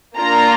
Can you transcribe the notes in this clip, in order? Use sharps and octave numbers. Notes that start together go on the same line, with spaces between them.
A#3 D4 F4 A#5